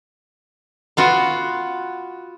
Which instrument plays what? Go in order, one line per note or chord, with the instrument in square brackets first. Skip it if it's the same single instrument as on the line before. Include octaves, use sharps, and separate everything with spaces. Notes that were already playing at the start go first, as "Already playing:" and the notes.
[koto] B3 F4 F#4